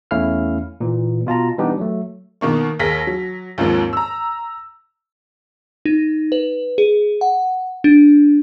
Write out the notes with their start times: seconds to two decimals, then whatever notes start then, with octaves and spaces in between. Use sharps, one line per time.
0.11 E2 A3 C#4 E4 F5 F6
0.80 A#2 E3
1.26 B2 F4 A5 A#5
1.58 E3 G3 B3 D4 D#4 G4
1.78 F#3 A3
2.41 B2 D#3 A#3 C#6
2.79 D#2 G#4 A#4 A#6 B6
3.07 F#3
3.58 D#2 G#2 F3 A#3 C4
3.93 A#5 E6
5.85 D#4
6.32 B4
6.78 G#4
7.21 F#5
7.84 D4